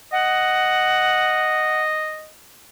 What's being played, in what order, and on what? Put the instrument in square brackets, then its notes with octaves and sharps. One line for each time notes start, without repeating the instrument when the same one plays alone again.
[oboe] D#5 [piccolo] F#5